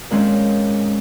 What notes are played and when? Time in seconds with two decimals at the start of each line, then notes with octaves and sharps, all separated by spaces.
0.10 A#2 D#3 G#3 C4 C#4